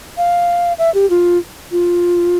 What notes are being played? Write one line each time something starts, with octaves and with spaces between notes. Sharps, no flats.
F5
E5
G4
F4
F4